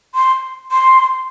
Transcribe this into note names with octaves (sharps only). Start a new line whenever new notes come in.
C6
C6